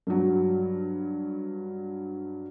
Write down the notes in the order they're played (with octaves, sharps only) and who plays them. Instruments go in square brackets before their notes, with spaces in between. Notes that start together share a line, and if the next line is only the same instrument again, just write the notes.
[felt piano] G2 F#3